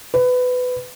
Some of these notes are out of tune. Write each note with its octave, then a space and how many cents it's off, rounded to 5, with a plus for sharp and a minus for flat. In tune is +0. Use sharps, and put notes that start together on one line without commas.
B4 +20